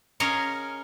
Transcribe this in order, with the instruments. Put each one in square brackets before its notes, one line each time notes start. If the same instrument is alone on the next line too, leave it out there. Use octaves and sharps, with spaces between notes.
[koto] C#4 G#4 A#4 C#5 D#5 F5